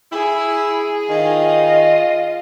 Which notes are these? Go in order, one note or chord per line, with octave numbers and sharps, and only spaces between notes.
E4 G#4
D#3 F4 D#5